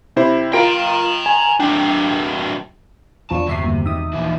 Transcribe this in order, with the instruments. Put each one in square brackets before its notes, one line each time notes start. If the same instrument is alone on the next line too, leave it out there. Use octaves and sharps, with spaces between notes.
[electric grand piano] C3 E4 C5
[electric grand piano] F4 A#4 D7 [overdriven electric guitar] G5 A#5
[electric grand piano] G#5
[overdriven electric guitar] F#3 D4 [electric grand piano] G5
[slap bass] G#1 E2 B3 [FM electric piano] F3 D4 [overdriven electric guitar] A5 [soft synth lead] C#6
[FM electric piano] G1 E5 C7 [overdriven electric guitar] C3
[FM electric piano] G1 [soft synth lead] A#3
[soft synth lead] D#4 [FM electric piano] E5 D#6
[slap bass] A#1 D#2 [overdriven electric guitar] E3 F3